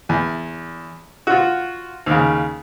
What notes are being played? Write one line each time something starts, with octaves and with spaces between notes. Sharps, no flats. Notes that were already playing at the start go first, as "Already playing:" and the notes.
E2
F4 F#4
D#2 C#3